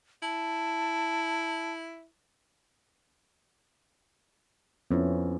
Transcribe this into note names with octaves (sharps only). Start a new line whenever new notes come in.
E4 A5
F2 B3 C#4 E4